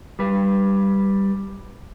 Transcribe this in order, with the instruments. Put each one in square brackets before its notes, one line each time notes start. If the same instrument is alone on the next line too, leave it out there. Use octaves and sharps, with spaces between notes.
[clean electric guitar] G3 B4